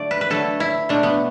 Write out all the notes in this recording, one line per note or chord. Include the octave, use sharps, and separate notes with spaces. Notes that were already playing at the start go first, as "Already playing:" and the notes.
Already playing: D3 F#3 A3 D5
B4
B4
D3 F#3 A3 A4
E4
B2 F#3 A3 D4
B3